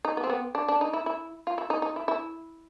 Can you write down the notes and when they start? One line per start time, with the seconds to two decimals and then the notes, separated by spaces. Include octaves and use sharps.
0.05 D#4
0.17 B3
0.24 C4
0.30 B3
0.55 D4
0.68 D4
0.81 D#4
0.93 E4
1.06 E4
1.47 F4
1.58 E4
1.70 D#4
1.82 D#4
1.96 E4
2.08 E4